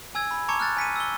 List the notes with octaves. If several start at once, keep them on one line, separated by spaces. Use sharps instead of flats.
G#5 E6 G#6
B5
A5 A#5 C#6 D6 G#6 C#7
F6 F#6 A6
G#5 B6 C#7 D#7
E6 G7